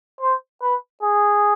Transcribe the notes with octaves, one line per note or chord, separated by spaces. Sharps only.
C5
B4
G#4